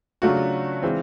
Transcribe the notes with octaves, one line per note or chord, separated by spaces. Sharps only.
C#3 F#3 A3 D4 F4 F#4
E3 G#3 C4 F4